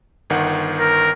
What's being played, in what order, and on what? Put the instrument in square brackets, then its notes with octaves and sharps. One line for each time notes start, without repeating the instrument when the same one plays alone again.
[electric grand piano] G1 D#3 F#5
[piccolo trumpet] A#4